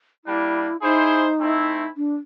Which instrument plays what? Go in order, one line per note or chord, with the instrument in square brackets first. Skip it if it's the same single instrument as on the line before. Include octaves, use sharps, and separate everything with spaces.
[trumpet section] G3 A#3 D4 [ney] E4
[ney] D#4 [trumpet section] E4 G#4 C5
[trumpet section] A3 C4 E4
[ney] D4